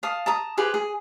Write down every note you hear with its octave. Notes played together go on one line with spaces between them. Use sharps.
F5 A5 D#6
A5 A#5 D#6
G4 G#4 B4 C5
G#4